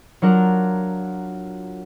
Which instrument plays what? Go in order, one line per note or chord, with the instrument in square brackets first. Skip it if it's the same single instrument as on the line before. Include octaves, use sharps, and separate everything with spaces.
[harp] F#3 D4 F4 A#4 F#5